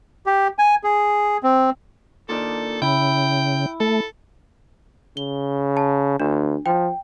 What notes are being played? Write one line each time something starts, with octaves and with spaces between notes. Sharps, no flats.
G4
G#5
G#4
C4
A#2 D#3 D4 A4
C#3 E4 G5
A3 A4
C#3 G7
A5
D2 D4
F3 G5